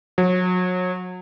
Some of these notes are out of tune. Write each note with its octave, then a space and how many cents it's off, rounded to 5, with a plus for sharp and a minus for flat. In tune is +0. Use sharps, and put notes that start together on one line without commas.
F#3 -30